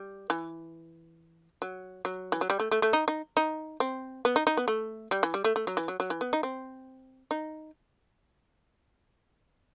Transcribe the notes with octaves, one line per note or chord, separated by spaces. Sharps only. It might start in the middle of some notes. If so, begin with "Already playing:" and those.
Already playing: G3
E3
F#3
F#3
E3
F#3
G3
A3
A3
A3
D#4
D#4
D#4
C4
B3
D#4
D#4
B3
A3
G3
E3
G3
A3
A3
F#3
E3
F#3
F#3
E3
B3
D#4
C4
D#4